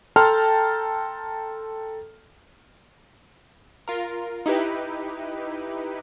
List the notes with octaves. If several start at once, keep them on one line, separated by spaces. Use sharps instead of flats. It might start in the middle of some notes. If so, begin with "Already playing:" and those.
A4 G5 A5 A#5 C6 F6
F4 A#4
D#4 E4 G4 B4